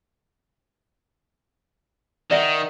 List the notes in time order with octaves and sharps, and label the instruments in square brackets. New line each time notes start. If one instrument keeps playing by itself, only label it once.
[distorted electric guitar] D#3 [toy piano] D5 E5 F#5